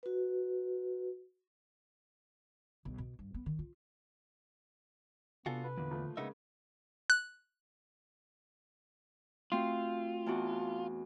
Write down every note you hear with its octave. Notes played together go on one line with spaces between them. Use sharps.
F#4 B4
B1
B2
G2
B3
D#3
F4
C3 B3 D4 F4 F#4 A4 G#5
B4
E2 A#2 D3
A#2 F3 A3
C#3 G#3 A#3 B3 D#4 E5
F#6
A3 C4 F4 F#4
E2 D4 F#4